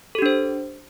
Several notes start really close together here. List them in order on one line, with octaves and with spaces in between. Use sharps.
A4 G4 D4 C5